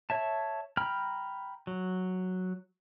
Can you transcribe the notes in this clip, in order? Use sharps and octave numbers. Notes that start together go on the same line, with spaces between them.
C#5 E5 A5
G5 A#5 B5 F6
F#3